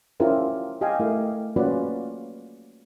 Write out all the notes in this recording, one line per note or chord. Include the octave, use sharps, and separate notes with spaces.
C#4 E4 F4 G4 A#4 C5
G4 D#5 F5 G5 G#5
A3 E4 A#4
A#3 C#4 F4 F#4 B4 D5